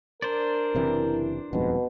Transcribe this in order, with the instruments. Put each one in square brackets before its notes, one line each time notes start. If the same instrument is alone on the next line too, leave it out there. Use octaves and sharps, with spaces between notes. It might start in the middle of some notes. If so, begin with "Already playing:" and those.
[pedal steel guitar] D4 C5 D5 [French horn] A#4
[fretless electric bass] F#1 C3 E3 [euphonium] E4
[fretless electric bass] D#1 F2 G#2 [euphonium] B2